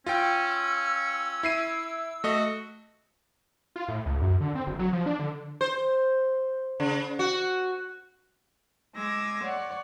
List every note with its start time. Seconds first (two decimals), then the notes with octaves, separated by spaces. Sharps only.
0.06 C#4 F4 G5 E6
1.43 E4 C7 D#7
2.24 A3 F#4 D#5
3.76 F4
3.88 A2
4.06 C#2
4.22 F#2
4.41 D3
4.55 C4
4.67 F#1
4.79 F#3
4.93 F3
5.06 D4
5.19 D3
5.61 C5
6.80 C#3
7.19 F#4
8.96 G#3 D6 E6 G#6 A#6
9.44 C#5 D5 F#5